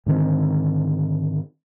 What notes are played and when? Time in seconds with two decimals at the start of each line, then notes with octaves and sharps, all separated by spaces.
0.06 G#2 D3 D#3 C4